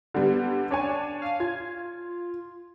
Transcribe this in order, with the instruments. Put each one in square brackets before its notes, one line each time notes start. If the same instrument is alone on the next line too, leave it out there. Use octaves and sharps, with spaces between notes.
[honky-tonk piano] D3 G3 B3
D4 C#5 G#5
[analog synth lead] F5
[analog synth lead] F4 [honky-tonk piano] G#6